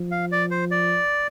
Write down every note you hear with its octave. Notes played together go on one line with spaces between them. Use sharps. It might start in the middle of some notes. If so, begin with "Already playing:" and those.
Already playing: F3
F5
D5
C5
D5